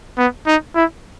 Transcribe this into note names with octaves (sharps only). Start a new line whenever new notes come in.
B3
D#4
E4